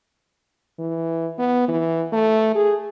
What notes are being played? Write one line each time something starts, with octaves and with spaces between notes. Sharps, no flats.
E3
B3
E3
A3
G#4